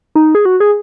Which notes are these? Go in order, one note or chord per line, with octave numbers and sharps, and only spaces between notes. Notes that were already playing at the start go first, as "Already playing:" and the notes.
D#4
G#4
F#4
G#4